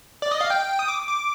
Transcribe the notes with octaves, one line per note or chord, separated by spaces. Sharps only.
D5
D#5
F5
G5
D#6
D6
D6